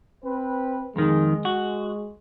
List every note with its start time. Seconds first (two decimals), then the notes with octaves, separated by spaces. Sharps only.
0.24 C4 B4
0.96 F2 D#3 G#3
1.45 F#4